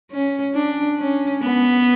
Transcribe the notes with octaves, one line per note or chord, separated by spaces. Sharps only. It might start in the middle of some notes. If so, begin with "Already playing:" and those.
C#4
D4
C#4
B3